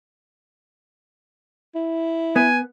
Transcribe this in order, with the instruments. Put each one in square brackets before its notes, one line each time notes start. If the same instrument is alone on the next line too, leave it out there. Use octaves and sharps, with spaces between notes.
[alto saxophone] E4
[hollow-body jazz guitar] B3 [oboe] G#5